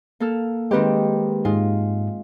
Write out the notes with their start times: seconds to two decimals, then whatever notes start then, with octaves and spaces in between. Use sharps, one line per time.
0.20 A#3 A4 F6
0.71 D#3 G#3 C4 G4 B4
1.45 G#2 G#3 F4